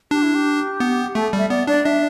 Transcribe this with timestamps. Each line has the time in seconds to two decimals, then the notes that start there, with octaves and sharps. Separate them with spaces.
0.11 D4 G4
0.23 E4
0.35 G4
0.80 B3
1.15 A3 A4
1.33 G3 E5
1.49 B3 D5
1.67 D4 D5
1.85 D4 E5